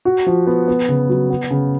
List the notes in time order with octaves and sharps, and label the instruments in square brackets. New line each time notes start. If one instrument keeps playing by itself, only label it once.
[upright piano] F#4
F3
B3
B3
C#3
F#3
B3
C#3